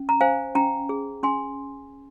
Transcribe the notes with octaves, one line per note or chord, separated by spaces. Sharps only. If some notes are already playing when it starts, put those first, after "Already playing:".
Already playing: C#4
A#5
C5 F5 G#5
C#4 G5 A#5
G#4
C#4 G#5 C6